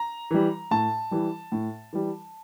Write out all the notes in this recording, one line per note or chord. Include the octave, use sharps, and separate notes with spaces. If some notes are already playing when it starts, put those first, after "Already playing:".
Already playing: A#5
E3 G3
A2 A5
E3 G3
A2
E3 G3